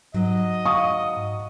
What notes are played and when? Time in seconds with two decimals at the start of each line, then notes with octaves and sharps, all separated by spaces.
0.14 G#2 F#3 D#5
0.65 F5 C#6 D#6